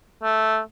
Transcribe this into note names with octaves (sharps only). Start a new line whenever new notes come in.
A3